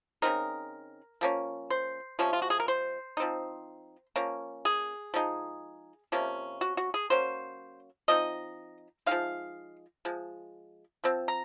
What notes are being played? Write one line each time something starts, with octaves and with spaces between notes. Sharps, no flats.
C#3 F3 C4 D#4 A#4
F3 A#3 C#4
C5
C3 F3 G#3 C#4
F4
F#4
G#4
A#4
C5
F3 C4 D#4
F3 A#3 C#4
G#4
F3 G#3 D#4
C3 F3 A#3 C#4
F#4
F#4
G#4
F#3 A#3 C#4 C5
F3 C4 D#4 D#5
F3 G#3 D#4 F5
F3 G#3
F3 C4
A#5